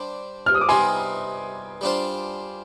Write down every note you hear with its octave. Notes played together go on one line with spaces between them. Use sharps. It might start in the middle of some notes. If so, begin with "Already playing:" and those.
Already playing: G3 D4 G4 C5
F6
D#6
D6
C3 G3 B3 D#4 G#5 C6
G3 D4 F4 C5